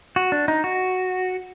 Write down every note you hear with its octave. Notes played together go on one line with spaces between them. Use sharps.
F#4
D4
D#4
F#4